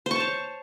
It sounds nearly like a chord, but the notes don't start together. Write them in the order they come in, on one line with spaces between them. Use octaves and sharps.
C5 C#6 A5 C#5